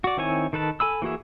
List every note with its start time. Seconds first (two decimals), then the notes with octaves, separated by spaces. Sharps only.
0.04 F#4 D5
0.17 D#3 C4 E4 C#5 G#5
0.53 D#3 A4 B4 A5
0.80 A4 G#5 B5 E6
1.02 E3 A#3 F#4 G#4 E5